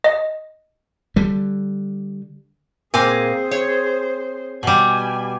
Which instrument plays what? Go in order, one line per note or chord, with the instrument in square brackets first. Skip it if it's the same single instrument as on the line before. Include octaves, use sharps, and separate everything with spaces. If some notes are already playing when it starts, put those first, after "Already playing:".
[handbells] D#5
[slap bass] D3 G3
[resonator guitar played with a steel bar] A#2 A#3 G#5 [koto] C4 [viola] G#4 C5
[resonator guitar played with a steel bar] C#5
[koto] B2 G3 [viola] G#5